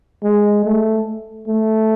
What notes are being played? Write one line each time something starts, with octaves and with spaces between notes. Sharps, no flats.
G#3
A3
A3